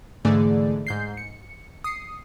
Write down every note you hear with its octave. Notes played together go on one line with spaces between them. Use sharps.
G#2 D3 E3 A3 G#4 D5
G#2 G6 C7
C#7
D#6 C7 C#7